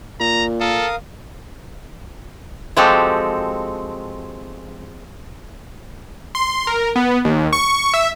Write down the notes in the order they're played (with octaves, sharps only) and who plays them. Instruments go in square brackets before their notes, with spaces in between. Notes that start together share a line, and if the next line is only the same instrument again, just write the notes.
[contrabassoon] A#2 [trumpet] A#5
[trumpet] A4 [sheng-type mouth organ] A#4 F5 D#6
[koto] F3 G#3 C4 F#4 G4 A4
[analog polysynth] C6
A#4
B3
D#2
C#6
E5